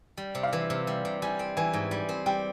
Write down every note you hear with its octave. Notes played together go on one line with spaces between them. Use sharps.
G3
C3
F5
E3
C3
G3
C3
G3 G#5
C4
E3 G#5
G#2
G3
C4
G3 G5